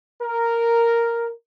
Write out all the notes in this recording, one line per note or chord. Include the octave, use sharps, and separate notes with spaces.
A#4